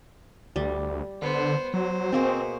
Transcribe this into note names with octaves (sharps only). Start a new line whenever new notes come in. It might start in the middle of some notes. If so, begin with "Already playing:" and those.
D2 G3
D3 B3 C5
F#3 C5
B2 A#3 C4 G#4